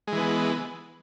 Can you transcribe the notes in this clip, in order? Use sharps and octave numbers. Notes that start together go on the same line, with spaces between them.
E3 G#3 B3